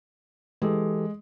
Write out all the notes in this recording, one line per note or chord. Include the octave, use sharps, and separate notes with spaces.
E3 G#3 G4 A4